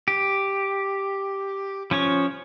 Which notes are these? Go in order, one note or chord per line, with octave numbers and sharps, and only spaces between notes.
G4
F3 C#4 C#5